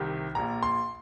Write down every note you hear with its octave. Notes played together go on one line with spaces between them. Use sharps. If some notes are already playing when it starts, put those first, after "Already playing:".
Already playing: C2 C3 D#3
A#1 A#2 A#5
C6